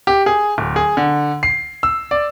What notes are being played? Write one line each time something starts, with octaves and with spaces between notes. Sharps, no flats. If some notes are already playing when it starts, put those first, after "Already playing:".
G4
G#4
D1
G#4
D3
C7
E6
D5